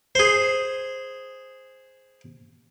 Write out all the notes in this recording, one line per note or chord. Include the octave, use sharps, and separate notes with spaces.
G#4 C5